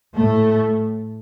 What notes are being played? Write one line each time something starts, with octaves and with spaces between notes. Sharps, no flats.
A2 A3